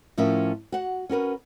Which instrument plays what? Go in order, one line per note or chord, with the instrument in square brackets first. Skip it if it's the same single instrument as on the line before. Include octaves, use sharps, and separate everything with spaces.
[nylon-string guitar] A2 F3 C#4 A#4 E5
F#4 F#5
C#4 F#4 A#4 B4